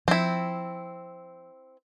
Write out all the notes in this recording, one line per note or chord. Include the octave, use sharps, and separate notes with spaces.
F3 C4 E4